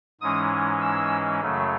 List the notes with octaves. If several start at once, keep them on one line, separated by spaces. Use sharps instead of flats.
G#2 E3 G#3 C#4 D#6
E6
F#2 C#3 F#3 A3